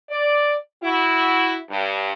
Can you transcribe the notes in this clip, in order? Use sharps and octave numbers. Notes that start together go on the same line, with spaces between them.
D5
E4 F#4
G2